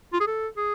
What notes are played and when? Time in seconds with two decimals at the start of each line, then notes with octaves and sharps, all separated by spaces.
0.13 F4
0.20 G#4
0.27 A4
0.57 G#4